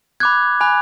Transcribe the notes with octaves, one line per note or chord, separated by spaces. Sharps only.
B5 D6 F#6 G#6
G#5 B5 F#6